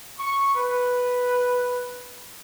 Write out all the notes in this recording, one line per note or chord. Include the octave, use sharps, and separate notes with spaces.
C#6
B4